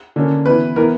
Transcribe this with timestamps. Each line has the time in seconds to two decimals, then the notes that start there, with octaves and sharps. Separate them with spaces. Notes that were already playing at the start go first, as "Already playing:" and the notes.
0.16 D3 A#3 C#4
0.46 E3 B3 B4
0.76 E3 B3 A#4